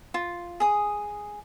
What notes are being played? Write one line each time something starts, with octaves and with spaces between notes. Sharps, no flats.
F4
G#4 D#6